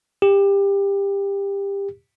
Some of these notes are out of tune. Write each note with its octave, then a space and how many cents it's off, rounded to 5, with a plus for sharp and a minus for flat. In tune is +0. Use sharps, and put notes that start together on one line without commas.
G4 +20